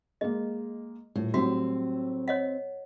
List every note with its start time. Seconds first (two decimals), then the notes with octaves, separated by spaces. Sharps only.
0.21 G#3 A#3 D#5
1.16 D#1 A2
1.34 A2 F#3 G3 C4 F#4
2.28 C#5 D#5 F#5